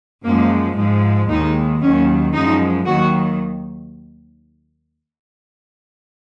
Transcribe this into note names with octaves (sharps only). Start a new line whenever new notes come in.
F#2 F3 G#3 A#3
G#2 F3 G#3
D#2 D#3 G#3 D#4
D#2 D#3 F#3 C#4
F#2 F3 G#3 D#4
D#2 D#3 F#3 F#4